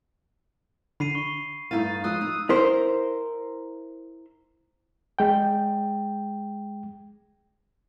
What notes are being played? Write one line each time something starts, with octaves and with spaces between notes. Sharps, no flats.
D3 D4 B5 C7 D#7
C#6
G2 A3 D#4 E4 F5 A6 D#7
F3 G#3 F4 D#6 E6 F#6
D#4
E4 A#4 C5
G#3 G5